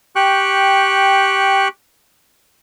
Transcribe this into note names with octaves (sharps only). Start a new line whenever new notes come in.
G4 G5 C#6 F#6